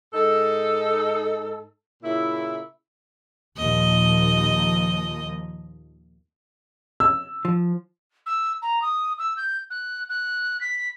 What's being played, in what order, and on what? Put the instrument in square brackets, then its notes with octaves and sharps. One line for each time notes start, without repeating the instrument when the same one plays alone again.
[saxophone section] G#2 D#4 A4
A#2 C#3 E4
[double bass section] D#2 A#2 F3 [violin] D#5
[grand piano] E6
[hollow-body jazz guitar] F3
[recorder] E6
A#5
D#6
E6
G6
F#6
F#6
B6